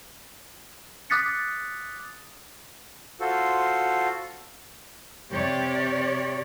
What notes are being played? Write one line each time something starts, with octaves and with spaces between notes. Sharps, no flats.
D6 D#6 F#6 A6 B6 C#7
F4 F#4 A4 C5
C3 G4 C#5 D5